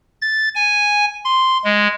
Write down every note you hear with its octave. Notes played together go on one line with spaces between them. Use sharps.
A6
G#5
C6
G#3